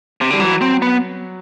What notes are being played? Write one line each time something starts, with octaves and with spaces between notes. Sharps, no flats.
C3
D3 G3
E3 F#3
C4
B3